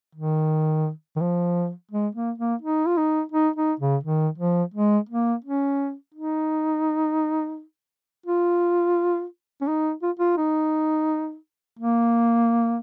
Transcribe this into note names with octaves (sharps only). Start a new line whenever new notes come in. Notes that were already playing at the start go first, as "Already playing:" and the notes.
D#3
D#3
F3
G#3
A#3
A#3
D#4
F4
D#4
D#4
D#4
C#3
D#3
F3
G#3
A#3
C#4
D#4
F4
C#4
D#4
F4
F4
D#4
A#3